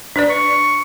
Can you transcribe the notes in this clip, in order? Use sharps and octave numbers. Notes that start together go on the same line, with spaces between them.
D4 B4 D5
C#6